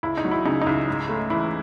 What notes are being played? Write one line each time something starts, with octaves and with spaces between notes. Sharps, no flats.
C#2 E4
D#4
F#3
E4
C#3 D#4
D#4
C#2 E4
G#2
A3
E3 E4